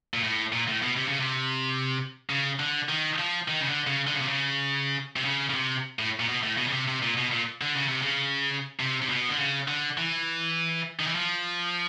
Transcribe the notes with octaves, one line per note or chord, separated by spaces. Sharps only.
A#2
A2
A#2
A2
B2
C3
C#3
C3
C#3
D3
D#3
F3
D#3
C#3
D3
C#3
D3
C#3
C3
C#3
C3
C#3
C#3
C3
A2
A#2
B2
A2
B2
C#3
C3
C3
A#2
B2
A#2
D3
C#3
C3
C#3
C3
C3
B2
D3
C#3
D3
E3
D#3
E3
F3